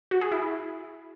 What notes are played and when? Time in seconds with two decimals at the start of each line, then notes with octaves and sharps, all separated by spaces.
0.11 F#4
0.21 G#4
0.31 E4